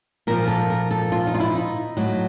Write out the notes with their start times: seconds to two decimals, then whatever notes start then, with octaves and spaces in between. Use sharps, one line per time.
0.27 A#2 F3 A#4
0.48 A4
0.70 A#4
0.91 A4
1.12 F4
1.27 D#4
1.35 F4
1.40 E4
1.55 D#4
1.97 A2 F#3